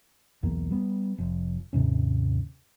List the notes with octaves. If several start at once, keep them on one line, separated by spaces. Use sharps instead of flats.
B1 E2 A#3
G3 B3
F1
D#2 G#2 C3 C#4